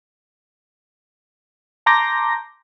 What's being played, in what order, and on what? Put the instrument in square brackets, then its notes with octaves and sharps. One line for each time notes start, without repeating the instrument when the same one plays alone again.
[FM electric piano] A5 A#5 C6 D6 G6 A#6